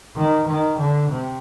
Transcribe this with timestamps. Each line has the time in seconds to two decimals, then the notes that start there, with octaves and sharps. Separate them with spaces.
0.16 D#3
0.47 D#3
0.78 D3
1.10 C3